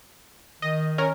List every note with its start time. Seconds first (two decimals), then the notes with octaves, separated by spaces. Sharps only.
0.62 D#3 D#5
0.98 C#4 A#4